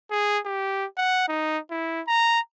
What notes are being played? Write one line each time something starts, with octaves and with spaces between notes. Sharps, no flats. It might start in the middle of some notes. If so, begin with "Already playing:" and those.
G#4
G4
F#5
D#4
E4
A#5